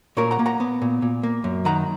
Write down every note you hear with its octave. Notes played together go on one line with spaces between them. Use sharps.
A#2 A#4 C#5
F#5 A#5
A#3
F#5 A#5
B3
A#2
A#2
A#3
F#2
D#3 F#5 A#5